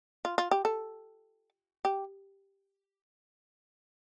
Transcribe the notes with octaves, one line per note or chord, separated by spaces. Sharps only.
F4
F4
G4
A4
G4